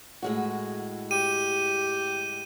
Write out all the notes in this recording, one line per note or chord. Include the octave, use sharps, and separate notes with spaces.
A2 G#3 F#4
G4 D#7